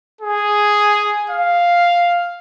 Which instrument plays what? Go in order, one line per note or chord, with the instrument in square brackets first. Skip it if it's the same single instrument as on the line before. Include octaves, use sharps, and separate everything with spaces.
[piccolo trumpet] G#4
F5